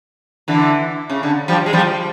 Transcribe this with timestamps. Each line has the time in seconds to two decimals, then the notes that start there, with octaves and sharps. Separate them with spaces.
0.48 D3 E3
1.10 C#3
1.23 D3
1.48 F3 G3
1.66 G#3
1.73 F3 G3